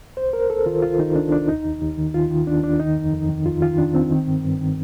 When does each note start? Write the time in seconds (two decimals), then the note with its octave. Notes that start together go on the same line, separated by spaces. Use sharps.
0.17 C2 C5
0.33 C2 A#4
0.50 C2 A4
0.66 D#3 F4
0.83 C2 F4
0.99 D#3 D#4
1.15 C2 D4
1.31 C2 D4
1.48 D#2 D#4
1.65 D#2
1.81 D#2
1.98 D#3
2.14 D#3 F4
2.30 D#3
2.47 D#2 D4
2.63 D#2 D4
2.79 D#3 D#4
2.96 F2
3.12 F2
3.29 D#3
3.45 F2 F4
3.62 D#3 F4
3.78 D#3 D4
3.94 D#3 C4
4.11 D#3
4.27 G2
4.44 G2
4.60 D#3